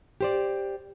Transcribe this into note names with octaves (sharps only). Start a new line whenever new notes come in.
G4 C5 D5